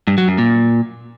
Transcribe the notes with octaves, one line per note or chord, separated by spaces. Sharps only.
G2
F#3
F#2
A#2